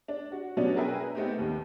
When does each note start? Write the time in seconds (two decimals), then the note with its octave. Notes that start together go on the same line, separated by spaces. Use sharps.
0.08 D4
0.32 F#4
0.57 G2 B2 F#3 B3 C#4 D4
0.76 G#4 A#4 B4 E5 G5 G#5
1.15 A3 B3 C4 D#4 G4
1.39 D#2